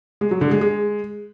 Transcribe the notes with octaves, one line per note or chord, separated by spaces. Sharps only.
G#3
F#3
D3
G#3
G#3